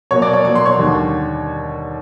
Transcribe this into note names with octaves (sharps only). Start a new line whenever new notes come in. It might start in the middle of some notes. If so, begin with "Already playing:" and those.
B2 F#3 A#3 C#5 C#6
D5 D6
C#5 C#6
B2 F#3 A#3 C#6
C6
C#5 C#6
D#2 D3 G3